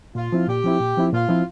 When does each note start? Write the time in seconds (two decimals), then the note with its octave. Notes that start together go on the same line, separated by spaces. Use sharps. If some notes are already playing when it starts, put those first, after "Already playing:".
0.15 A#2 F4
0.32 F3 C4 E4
0.48 A#2 G4
0.64 F3 C4 E4
0.80 A#2
0.97 F3 C4 E4
1.12 A#2 F4
1.29 F3 C4 E4